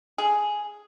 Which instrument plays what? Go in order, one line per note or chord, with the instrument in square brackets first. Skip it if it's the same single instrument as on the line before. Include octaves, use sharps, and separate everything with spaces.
[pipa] G#4